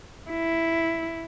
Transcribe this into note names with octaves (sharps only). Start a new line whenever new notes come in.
E4